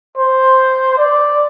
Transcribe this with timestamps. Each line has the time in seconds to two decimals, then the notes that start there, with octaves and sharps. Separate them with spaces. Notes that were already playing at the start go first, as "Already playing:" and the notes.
0.17 C5
0.98 D5